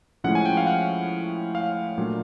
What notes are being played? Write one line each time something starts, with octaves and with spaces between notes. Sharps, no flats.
A2 F3 G#3 C#4 F#5
G#5
G5
F5
F#5
F5
A#2 F#3 A3 D4